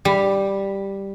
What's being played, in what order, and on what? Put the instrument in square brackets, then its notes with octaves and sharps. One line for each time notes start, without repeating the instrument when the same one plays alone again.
[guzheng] G3